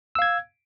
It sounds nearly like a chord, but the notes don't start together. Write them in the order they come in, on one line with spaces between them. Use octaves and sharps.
E6 F5 G#6